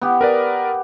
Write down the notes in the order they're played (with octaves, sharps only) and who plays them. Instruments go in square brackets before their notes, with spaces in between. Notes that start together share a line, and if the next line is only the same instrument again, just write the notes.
[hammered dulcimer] B3 G4
[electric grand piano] A#4 B4 D5